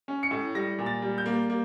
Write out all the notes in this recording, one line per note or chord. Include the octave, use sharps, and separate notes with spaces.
C#4
C#7
A2
G3 A#6
A#2
A6
G3
G6
A#3
A#3